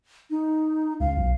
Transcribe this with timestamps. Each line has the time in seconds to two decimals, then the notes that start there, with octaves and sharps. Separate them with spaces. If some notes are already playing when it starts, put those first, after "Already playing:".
0.30 D#4
1.00 C#2 F5
1.17 B1